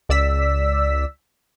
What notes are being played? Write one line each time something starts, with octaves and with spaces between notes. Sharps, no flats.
C#2 D5 E6 B6